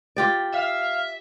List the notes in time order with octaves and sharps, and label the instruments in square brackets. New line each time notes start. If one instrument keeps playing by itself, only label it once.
[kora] F4 G4 D5
[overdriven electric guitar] E5 [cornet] F5